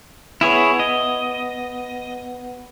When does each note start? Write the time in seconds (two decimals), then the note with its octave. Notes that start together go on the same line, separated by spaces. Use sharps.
0.41 B3 E4 G#4 B4 C#5 F#5
0.80 D#5